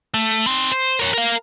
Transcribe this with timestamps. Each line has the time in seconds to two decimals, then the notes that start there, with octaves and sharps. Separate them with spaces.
0.14 A3
0.47 C4 D#4
0.72 C5
0.99 A#4 C#5
1.14 A#4 F5